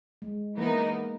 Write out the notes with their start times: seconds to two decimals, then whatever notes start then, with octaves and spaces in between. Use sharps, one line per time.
0.22 G#3
0.57 E3 A#3 B3 D#4 A#4